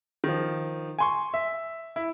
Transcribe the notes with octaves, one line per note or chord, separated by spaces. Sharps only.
D#3 F3
G#5 C6 C#6
E5
E4